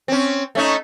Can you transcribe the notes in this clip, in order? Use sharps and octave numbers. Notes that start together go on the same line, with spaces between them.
C4 C#4
A3 C#4 D#4